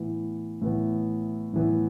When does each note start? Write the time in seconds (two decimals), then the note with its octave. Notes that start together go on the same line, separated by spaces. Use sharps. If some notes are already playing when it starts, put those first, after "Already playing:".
Already playing: A2 E3 B3
0.62 A2 E3 B3
1.53 A2 E3 B3